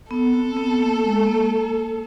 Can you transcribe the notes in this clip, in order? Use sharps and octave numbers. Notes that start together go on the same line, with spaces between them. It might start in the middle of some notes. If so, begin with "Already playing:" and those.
B3 A4
C4
B3
A#3
G#3
A#3